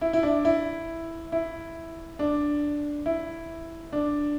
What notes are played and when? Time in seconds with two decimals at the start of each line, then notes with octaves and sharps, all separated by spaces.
0.01 E4
0.13 E4
0.23 D4
0.45 E4
1.32 E4
2.19 D4
3.06 E4
3.93 D4